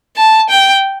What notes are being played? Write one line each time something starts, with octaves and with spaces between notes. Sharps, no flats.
A5
G5